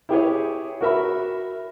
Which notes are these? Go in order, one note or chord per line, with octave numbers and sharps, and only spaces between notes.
E4 G4 G#4 C#5
F#4 A#4 E5 B5